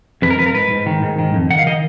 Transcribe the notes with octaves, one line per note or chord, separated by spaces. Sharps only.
F2 B4
A#4
F2 B4
A#4
G#2 B4
G#2
D#3
G#2
D#3
F2
D#3 F#5
F5
D#3 D#5